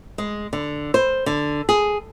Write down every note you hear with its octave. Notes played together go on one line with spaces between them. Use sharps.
G#3
D3
C5
D3
G#4